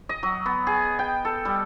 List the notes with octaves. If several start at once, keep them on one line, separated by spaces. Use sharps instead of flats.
D#5
F#3
B3
G#4
G5
A4
G3